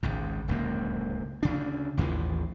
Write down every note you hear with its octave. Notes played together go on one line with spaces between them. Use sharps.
G#1 C#2 G#2
D1 C#2 F#2 A#3
D2 C#3 D4
A1 D#2 E3 F3